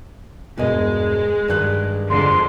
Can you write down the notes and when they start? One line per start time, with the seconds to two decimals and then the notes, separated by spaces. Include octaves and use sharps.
0.57 E1 G2 B2 G#3 G#4 D#5
1.48 G2 D#3 G3 D5 F#6
2.10 F2 D3 G#3 C6